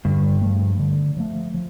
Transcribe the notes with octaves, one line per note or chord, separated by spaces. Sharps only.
G2 D3
F3 A3
D3
F3 A3
F3